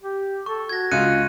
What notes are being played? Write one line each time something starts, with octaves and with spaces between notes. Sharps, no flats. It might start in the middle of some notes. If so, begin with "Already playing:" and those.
G4
A4 C#6
F#4 G#6 A#6
C#2 F4 F#6 C#7 D#7